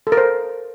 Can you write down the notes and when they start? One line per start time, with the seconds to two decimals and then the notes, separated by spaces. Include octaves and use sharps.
0.07 A4
0.12 A#4
0.17 C5